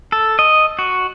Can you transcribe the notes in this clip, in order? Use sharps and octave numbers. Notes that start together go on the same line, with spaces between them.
A4
D#5
F#4